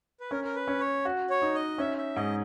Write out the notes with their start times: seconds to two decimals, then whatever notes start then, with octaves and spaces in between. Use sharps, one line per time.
0.20 B4
0.31 C#4 A#4
0.44 A#4
0.55 B4
0.67 C#4
0.80 C#5
1.05 F#4
1.30 C#5
1.42 D#4
1.55 D#5
1.78 C#4 E5
1.98 E5
2.16 G#2 D#5